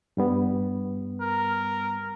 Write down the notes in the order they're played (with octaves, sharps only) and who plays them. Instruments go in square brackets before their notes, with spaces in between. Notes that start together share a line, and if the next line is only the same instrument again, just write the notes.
[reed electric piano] G2 G3 B3
[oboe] A#4